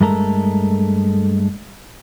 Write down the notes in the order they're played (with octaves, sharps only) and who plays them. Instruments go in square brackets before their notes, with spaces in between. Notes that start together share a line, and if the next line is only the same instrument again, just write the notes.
[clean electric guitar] G2 G#3 A3 A4 A#4